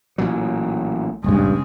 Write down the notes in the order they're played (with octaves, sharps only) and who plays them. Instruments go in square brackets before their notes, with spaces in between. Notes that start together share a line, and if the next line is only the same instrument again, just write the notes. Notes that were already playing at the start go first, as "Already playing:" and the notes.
[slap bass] A1 A#2 F#3
[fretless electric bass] D#1 G#1 G2 [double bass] C#3 G#3